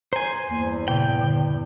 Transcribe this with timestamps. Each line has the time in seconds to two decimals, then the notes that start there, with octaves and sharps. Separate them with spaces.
0.13 C5 G#5 A#5
0.51 E2 G2 A#3
0.88 A#2 C#3 G5
1.21 D3